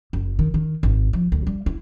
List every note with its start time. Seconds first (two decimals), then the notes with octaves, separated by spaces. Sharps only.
0.13 F#1
0.39 D#3
0.54 D#3
0.83 G#1
1.13 F3
1.32 D2
1.47 G3
1.66 E4